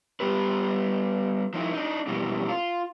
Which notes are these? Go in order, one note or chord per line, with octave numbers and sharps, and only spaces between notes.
G3 B3 G4 B4
F3 D#4 E4
D4 D#4
F2 B2 E3 G3
F4